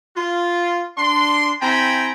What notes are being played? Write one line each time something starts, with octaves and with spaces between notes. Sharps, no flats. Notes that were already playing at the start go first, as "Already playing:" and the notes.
F4
D4 C6
C4 E4 G5 G#5 A#5 B5